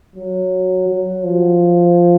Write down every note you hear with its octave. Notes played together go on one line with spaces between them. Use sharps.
F#3
F#3
F3